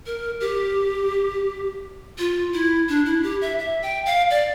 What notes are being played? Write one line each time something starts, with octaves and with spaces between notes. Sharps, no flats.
A#4
G4
F4
E4
D4
E4
G4
E5
E5
G5
F5
D5